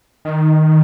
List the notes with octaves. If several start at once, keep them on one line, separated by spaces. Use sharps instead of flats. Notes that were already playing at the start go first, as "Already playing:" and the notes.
D#3